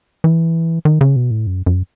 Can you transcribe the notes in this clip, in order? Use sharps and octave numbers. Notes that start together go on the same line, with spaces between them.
E3
D#3
C#3
B2
A2
F#2
F#2